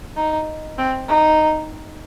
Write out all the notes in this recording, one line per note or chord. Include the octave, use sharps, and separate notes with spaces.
D#4
C4
D#4